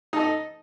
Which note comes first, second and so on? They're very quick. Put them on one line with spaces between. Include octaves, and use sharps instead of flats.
D#4 A4 D#5